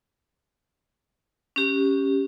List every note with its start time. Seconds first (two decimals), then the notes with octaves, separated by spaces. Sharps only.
1.56 C#4 G4